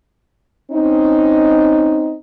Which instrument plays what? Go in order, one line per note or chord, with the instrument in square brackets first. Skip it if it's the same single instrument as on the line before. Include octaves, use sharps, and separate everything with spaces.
[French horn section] C4 C#4 D#4